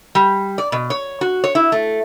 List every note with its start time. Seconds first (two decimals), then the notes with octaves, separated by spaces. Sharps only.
0.15 G3
0.58 D5
0.72 B2
0.90 C#5
1.21 F#4
1.44 C#5
1.55 E4
1.72 A3